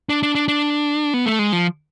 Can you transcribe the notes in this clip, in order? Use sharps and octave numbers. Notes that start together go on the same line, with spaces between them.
D4
D4
D4
D4
B3
A3
G#3
F3